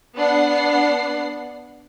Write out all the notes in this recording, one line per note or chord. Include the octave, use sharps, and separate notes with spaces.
B3 D4 F#5 C7